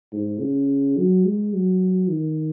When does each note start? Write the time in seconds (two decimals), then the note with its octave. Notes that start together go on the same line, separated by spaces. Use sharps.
0.13 G#2
0.41 C#3
0.97 F#3
1.25 G#3
1.54 F#3
2.09 D#3